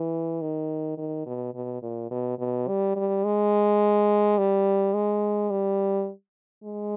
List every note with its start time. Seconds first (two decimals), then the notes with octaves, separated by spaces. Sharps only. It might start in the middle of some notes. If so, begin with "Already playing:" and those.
Already playing: E3
0.41 D#3
0.97 D#3
1.26 B2
1.54 B2
1.82 A#2
2.11 B2
2.39 B2
2.68 G3
2.96 G3
3.24 G#3
4.38 G3
4.94 G#3
5.51 G3
6.64 G#3